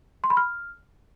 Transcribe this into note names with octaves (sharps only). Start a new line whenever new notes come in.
C6
B5
F6